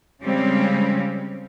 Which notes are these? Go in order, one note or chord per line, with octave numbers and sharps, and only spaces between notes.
C#3 F3 G3 G#3 C4 C#4